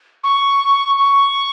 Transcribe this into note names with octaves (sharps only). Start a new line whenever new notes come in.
C#6
C#6